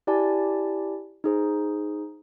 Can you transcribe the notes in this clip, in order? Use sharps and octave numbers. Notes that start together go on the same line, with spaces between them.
E4 G4 D5 G#5 A5
D#4 G#4 C5